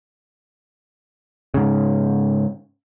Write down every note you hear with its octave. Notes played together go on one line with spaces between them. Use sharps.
G#2 C#3